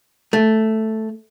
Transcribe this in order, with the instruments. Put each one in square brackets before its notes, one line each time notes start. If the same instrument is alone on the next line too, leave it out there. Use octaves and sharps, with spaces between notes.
[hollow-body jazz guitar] A3